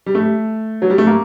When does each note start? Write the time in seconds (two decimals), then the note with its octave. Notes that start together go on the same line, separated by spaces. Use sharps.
0.06 G3
0.15 A3
0.82 F#3
0.90 G3
0.98 A3
1.07 A#3